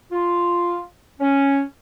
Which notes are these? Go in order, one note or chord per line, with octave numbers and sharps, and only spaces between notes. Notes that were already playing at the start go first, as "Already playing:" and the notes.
F4
C#4